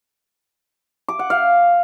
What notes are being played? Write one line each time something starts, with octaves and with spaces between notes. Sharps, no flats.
D6
F#5
F5